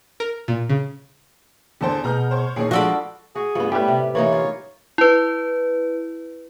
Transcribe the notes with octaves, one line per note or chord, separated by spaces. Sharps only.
A#4
A#2
C#3
E2 D3 A4 C5 A5
B2 G#4 F#5 A#5 F6 G6
C5 C#5
D#2 A#2 D#4 G#4 C#5 C7
F3 G#3 D4 F4 F#4 A4 D5 B5
F#4 G#4
G2 B3 F4
A2 G3 G4 B4
C3
E3 A#3 D#4 C#5
F4
E4 B4